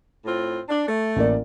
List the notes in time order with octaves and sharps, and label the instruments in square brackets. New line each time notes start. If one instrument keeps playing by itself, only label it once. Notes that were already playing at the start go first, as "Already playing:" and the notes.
[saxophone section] A2 C4 F4
D4
A3
[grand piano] A1 A#3 D5